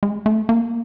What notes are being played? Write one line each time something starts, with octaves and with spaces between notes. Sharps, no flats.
G#3
A3
A#3